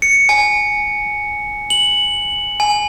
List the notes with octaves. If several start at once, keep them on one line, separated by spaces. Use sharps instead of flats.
C#7
G#5
F#7
G#5